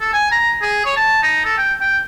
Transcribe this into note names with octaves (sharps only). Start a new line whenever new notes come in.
A4
G#5
A#5
G#4
C#5
A5
D#4
A4
G5
G5